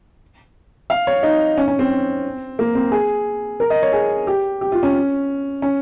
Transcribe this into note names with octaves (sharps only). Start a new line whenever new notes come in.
F5
C#5
D#4
C#4
C#4
C4
A#3
C4
G#4
A#4
D#5
C#5
G#4
G4
G4
F4
C#4
C#4